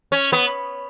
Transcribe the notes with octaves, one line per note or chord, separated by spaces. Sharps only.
C#4
B3